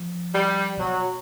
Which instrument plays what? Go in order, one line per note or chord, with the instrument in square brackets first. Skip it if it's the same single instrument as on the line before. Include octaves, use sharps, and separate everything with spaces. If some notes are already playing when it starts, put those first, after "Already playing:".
Already playing: [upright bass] F3
[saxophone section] G3
[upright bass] B2 [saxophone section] F#3